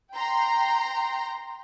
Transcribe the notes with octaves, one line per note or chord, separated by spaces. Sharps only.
G5 A#5 C6